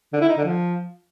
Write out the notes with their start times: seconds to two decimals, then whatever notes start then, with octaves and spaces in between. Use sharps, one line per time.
0.13 D3
0.21 E4
0.29 D#4
0.37 D3
0.45 F3